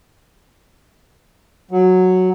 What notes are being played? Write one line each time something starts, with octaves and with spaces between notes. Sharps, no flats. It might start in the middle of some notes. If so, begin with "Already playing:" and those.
F#3